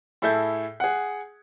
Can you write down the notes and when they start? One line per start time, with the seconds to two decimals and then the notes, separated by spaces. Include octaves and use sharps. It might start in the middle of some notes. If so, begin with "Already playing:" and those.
0.22 A2 E4 G#4 A4 E5 G6
0.80 G#4 F#5